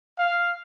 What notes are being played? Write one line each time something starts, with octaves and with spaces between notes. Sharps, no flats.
F5